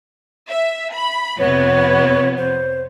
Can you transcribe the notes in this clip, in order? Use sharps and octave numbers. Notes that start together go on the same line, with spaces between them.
E5
B5
F2 C3 B3 C#5
C5